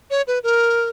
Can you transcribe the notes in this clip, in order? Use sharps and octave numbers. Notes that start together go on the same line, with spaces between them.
C#5
B4
A#4